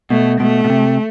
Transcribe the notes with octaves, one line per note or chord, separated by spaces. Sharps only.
B2 A3
B2 A3
B2
C3